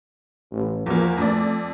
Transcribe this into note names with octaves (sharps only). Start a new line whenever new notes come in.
A1
E2 F3 A#3
F2 A3 D5